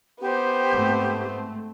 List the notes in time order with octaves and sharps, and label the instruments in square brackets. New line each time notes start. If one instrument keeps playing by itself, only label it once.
[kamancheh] B3 C5 [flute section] G4
[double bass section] G#2 A3 C4